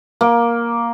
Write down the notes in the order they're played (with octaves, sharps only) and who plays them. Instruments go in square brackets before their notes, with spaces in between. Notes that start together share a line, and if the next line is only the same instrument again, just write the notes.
[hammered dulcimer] A#3